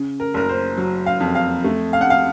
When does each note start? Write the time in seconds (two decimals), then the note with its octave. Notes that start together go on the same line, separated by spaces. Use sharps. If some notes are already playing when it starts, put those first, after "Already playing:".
Already playing: C#3
0.20 A#4
0.34 F#1 A#4
0.49 C5
0.77 F#3
1.06 F5
1.20 F2
1.35 F5
1.64 A3
1.93 F5
2.01 F#5
2.10 F5